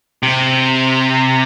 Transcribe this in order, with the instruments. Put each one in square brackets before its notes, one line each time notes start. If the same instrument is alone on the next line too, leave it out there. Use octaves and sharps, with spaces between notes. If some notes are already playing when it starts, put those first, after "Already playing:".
[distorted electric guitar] C3